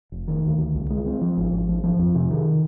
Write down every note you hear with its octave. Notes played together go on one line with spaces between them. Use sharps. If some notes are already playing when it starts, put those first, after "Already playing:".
F1
D#3
D2
D2
C2
G#3
C4
F3
G#1
G#1
F3
F3
F2
C3
D#3